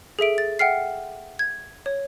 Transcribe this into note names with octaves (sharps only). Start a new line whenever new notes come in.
G#4 A4 E5 D7
A6
E5 F#5 G5 F6 C7
G#6
C#5